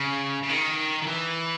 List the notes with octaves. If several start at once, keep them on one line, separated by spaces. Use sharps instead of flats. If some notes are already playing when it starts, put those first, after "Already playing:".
Already playing: C#3
C#3
D#3
D#3
E3